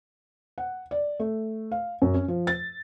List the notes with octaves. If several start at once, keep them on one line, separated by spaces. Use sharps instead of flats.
F#5
D5
A3
F5
F#2
C#4
F3
A6